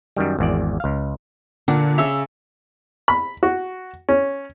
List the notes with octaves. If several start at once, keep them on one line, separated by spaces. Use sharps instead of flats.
F#2 D#3 G3
G#1 E2 D5
C#2 F5
A#2 D3 A#3 D4 F#5
C#3 C#5 E5 E6
B5
F#4
C#4